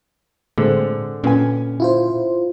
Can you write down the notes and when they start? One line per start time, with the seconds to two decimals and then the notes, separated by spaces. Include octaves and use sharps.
0.58 A2 D3 G#3 C4
1.24 A#2 C#4 B4 G#5
1.80 E4 F4 C5